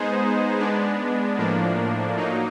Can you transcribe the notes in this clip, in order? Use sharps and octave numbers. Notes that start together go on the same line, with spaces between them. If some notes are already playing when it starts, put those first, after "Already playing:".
Already playing: G#3 B3 D#4 G#4 C5
G#3 B3 D4
A2 F3 A#3 D4
F#3 A#3 D#4